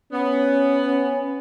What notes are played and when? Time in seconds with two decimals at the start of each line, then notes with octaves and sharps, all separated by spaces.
0.12 B3 C#4
0.86 C#4